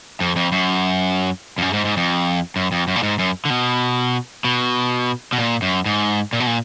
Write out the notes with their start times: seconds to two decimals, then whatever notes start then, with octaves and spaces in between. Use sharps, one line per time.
0.20 F2
0.36 F2
0.52 F#2
1.58 F2
1.62 F#2
1.73 G#2
1.85 G#2
1.97 F2
2.56 F#2
2.72 F2
2.88 F#2
2.96 A#2
3.03 G#2
3.19 F#2
3.45 D3
3.50 B2
4.44 B2
5.33 B2
5.38 A#2
5.62 F#2
5.85 G#2
6.33 A#2
6.40 B2
6.47 A#2